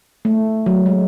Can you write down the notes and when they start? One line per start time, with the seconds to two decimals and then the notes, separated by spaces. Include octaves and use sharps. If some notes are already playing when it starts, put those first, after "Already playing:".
0.25 A3
0.66 F#3
0.86 G#3